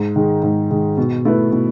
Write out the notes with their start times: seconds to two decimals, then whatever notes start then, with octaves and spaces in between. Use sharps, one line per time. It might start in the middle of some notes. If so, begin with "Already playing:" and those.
Already playing: G#2
0.16 D#3 G#3
0.43 G#2
0.71 D#3 G#3
0.98 B2
1.25 A3 E4 B4
1.52 B2